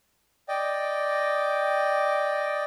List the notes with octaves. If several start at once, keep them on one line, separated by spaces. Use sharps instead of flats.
D5 D#5 G5